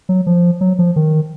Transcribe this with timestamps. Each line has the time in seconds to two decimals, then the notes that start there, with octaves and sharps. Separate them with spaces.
0.09 F#3
0.27 F3
0.61 F#3
0.79 F3
0.96 D#3